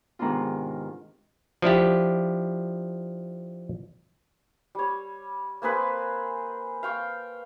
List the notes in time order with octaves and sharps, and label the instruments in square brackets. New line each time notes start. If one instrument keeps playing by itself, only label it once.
[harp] G#2 C3 D#3 B3 D4 F4
[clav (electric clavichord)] F3 D4 E4 G4
[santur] G3 C#5
A#3 C4 G#4 B4
F5 G5 C#6